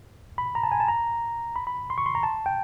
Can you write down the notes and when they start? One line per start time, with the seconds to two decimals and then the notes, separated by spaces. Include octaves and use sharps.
0.38 B5
0.55 A#5
0.63 A5
0.72 G#5
0.80 A5
0.88 A#5
1.56 B5
1.67 B5
1.90 C6
1.98 C#6
2.06 C6
2.15 A#5
2.23 A5
2.46 G5